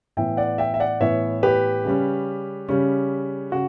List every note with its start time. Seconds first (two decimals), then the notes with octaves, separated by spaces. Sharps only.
0.17 A2 E3 B3 E5 G5
0.37 D5 F#5
0.58 E5 G5
0.74 E5
0.80 D5 F#5
1.00 A2 E3 B3 C#5 E5
1.43 G4 B4
1.85 C#3 G3 C#4
2.69 C#3 G3 C#4
3.52 C#3 F#4